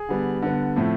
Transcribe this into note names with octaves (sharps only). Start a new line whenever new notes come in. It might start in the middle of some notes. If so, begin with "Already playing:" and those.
Already playing: G#4
D3 G3 B3
D3 G3 B3
A2 F3 A3 C4